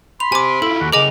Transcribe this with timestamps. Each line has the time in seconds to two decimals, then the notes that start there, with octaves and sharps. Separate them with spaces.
0.20 B5 C6 F7
0.32 G4 C5 G#5 D6
0.62 E4 F4 A4
0.80 D#2 F#4
0.93 C#3 G#4 A#4 D#5 G#5 D6 F7